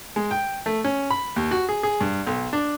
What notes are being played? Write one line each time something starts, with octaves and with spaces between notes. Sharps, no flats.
G#3
G5
A3
C#4
B5
D#2
F#4
G#4
G#4
G2
B1
D4